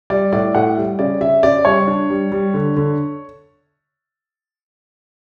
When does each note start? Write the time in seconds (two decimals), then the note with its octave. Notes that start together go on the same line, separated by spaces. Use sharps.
0.10 G3 D5
0.32 A2 D5
0.55 A2 F#5
0.77 G3
0.99 C#3 D5
1.21 C#3 E5
1.43 C#3 D5
1.65 G3 C#5
1.87 D4
2.10 G3
2.32 G3
2.54 D3
2.77 D3